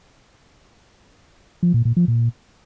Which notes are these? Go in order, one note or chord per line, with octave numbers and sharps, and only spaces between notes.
F3
A#2
A#2
F3
A#2